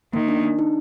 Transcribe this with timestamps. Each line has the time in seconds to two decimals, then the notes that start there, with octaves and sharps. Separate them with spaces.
0.13 D#3 A#3
0.28 D4
0.44 D4
0.59 D#4